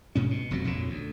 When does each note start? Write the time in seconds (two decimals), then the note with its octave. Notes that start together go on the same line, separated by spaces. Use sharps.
0.15 G#2 B2 C#4
0.31 B2
0.51 F1 F2 B2 F#3
0.64 A#1 F2 A#2 C#3
0.90 D2